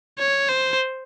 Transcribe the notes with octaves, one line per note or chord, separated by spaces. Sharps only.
C#5
C5